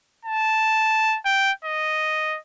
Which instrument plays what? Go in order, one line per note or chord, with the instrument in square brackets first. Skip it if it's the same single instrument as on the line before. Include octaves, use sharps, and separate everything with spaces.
[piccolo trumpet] A5
G5
D#5